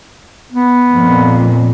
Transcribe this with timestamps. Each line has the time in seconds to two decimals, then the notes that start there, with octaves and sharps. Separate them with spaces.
0.52 B3
0.93 F2 A#2